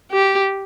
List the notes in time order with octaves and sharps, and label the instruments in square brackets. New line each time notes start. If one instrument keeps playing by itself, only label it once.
[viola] G4